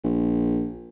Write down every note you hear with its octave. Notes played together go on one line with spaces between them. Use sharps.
A#1